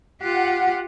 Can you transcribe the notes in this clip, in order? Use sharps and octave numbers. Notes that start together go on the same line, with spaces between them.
F4 G4 F#5